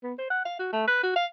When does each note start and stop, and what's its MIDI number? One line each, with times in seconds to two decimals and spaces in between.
0.03 0.13 59
0.18 0.27 72
0.30 0.41 78
0.45 0.55 77
0.59 0.72 66
0.73 0.85 57
0.88 1.02 71
1.03 1.14 66
1.16 1.26 77